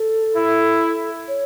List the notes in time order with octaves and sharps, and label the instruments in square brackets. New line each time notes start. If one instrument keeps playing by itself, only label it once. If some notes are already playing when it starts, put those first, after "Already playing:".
Already playing: [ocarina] A4
[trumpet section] E4
[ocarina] C#5